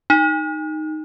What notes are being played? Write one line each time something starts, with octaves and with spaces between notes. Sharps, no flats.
D#4